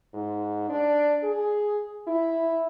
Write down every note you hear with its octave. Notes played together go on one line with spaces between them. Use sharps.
G#2
D4
G#4
E4